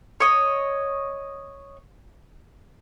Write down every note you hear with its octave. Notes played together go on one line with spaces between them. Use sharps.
C#5 D#5